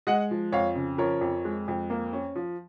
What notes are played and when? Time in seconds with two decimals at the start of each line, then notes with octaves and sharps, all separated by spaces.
0.07 G#3 D#5 F#5
0.31 F3
0.52 F2 C#5 F5
0.75 C#3
0.98 F3 A#4 C#5
1.21 F2
1.45 G#3
1.68 F2
1.90 A#3
2.13 C#4
2.35 F3